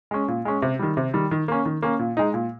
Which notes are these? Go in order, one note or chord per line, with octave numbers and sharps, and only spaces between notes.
G#3 C#4
A#2
G#3 C#4
C3
D#3 G3
C3
D#3 G3
D#3
A#3 C#4
D#3
A#3 C#4
A#2
G#3 D#4
A#2